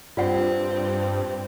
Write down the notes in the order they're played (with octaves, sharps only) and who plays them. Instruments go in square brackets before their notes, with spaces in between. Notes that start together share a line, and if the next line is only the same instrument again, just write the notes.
[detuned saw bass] G2 [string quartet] C4 [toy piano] F4 D5 F#5